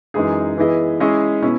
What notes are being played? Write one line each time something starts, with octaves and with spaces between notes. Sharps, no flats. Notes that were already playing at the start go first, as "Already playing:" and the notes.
F#2 E3 G#3 D#4 G#4
E3 B3 E4 G#4 D#5
G#3 C#4 E4 G#4 D#5
B2 C#4 E4